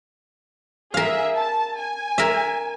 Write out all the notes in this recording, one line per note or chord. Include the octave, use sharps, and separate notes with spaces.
G#4 A#4 E5 F5
A5
G#5
A#4 E5